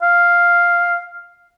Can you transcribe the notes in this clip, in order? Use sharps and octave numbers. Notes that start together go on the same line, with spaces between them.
F5